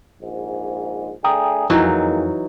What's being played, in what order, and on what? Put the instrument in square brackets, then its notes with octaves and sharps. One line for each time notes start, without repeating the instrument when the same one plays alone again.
[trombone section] A#1 G#2
[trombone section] A3 D4 G#4 [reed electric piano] G5 A#5 D#6
[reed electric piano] F2 [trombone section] D#3 G#3 A#3 [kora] E3 F#3 D#4